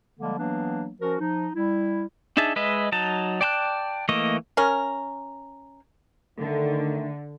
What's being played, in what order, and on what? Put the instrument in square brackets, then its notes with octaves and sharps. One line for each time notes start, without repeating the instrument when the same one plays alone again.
[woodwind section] D3 F3 G3 G#3 A#3
E3 F#3 A#3 B3 D4
F3 C#4 F#4 A#4
F3 D#4
G3 E4
[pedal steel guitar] D4 D#4 G#4 E5 A5
G#3 B4 D#5 E5
F#3 D#4 A5
D5 G5 A5 C6 F#6
E3 A3 A#3 D#5 C#6
[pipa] C#4 A#4
[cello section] D3 [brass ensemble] D#3 A3